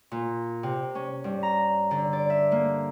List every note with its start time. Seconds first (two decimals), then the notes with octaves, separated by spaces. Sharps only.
0.11 A#2
0.63 C3
0.95 C#4
1.24 G2
1.43 A#5
1.91 D3
2.13 D5
2.30 E5
2.52 A#3